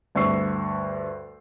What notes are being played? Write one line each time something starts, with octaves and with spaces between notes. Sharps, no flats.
D2 G2 C#6 E6 C7